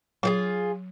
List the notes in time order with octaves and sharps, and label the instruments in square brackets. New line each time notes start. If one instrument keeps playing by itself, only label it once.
[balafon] F#3 [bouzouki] F4 G4 G#4